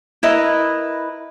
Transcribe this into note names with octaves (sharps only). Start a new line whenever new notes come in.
E4 A#4 B4 D#5